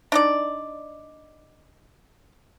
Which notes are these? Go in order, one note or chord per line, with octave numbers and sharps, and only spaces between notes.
D4 D#4 D5